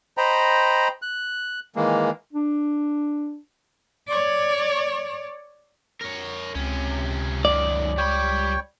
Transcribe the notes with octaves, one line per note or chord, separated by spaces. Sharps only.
C5 D#5 G5 A#5 B5
F#6
D#3 E3 G#3 A#3
D4
C#5 D5
A#4 C#5
C#2 C3 C#4
F#2 D#3 D5
G3 C#5 G5 B5